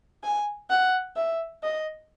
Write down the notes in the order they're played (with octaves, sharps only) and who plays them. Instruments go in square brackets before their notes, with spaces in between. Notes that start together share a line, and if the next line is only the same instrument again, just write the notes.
[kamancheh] G#5
F#5
E5
D#5